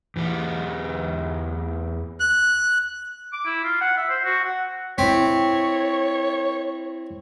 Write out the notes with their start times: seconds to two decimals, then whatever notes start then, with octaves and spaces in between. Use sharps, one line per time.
0.16 E2 E3 G4
2.20 F#6
3.33 D6
3.45 E4
3.64 F4
3.81 F#5
3.97 E5
4.09 C5
4.24 F#4
4.44 F#5
4.98 C4 E4 C#5 B6